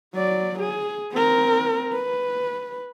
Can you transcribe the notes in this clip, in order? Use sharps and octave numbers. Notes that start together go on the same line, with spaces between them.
F#3 D5
G#4
C4 A#4
B4